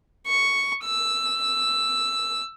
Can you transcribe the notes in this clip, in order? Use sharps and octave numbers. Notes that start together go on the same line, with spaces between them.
C#6
E6